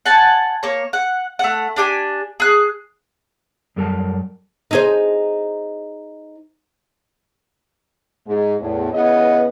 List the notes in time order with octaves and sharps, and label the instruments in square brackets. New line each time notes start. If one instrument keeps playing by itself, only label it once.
[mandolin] F#5 G#5 A5
A#3 C#5
F#5
A3 F#5
D4 G4 G#5
G#4 F#6
[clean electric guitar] F#2 G3 A4 A#4 G5 A5
[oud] D#4 G#4 C5
[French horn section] G#2
E2 A2
C#3 E3 B3 B4 D#5